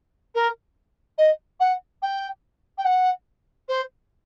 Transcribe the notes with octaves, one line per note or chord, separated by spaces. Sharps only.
A#4
D#5
F#5
G5
G5
F#5
C5